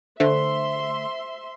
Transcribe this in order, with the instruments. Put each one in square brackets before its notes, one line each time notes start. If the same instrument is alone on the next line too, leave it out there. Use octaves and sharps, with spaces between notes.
[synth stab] D3 A3 [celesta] C5 [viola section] E5 C6